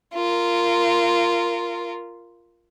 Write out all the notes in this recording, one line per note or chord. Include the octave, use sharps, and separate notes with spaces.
F4 A#4